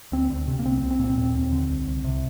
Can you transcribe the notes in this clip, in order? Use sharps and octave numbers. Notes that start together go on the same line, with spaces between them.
D2 C4
D2
C3
A#3
C2 C4
C4
C2
C4
A#2
C4
D#2 C4
D#2
D3
C2
C2
C3